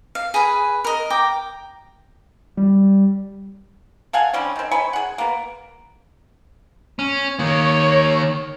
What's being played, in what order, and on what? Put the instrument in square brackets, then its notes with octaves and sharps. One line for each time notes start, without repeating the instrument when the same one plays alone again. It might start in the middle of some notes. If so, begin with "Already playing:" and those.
[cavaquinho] F5
G#4 B4 G#5
A#4 D#5
G5 A#5 D6
[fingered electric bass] G3
[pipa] A4 F5 F#5 G#5
D3 G3 C4 C#4
D#3 C4
C#5 G#5 B5 C6
G#4 F#5
A#3 B3
[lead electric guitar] C#4
[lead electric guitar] D#3 A#3 [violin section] C#5